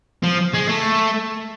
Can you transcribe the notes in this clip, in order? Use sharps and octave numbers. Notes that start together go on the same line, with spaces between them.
F3
G#3
A3